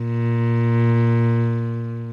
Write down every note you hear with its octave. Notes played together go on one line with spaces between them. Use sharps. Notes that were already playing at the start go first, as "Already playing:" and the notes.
Already playing: A#2